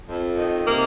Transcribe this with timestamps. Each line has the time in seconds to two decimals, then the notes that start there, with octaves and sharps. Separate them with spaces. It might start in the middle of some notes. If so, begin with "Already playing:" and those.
0.08 F2
0.37 D#3
0.67 C3 A#3